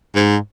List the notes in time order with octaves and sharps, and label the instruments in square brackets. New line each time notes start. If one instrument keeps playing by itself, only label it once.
[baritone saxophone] G#2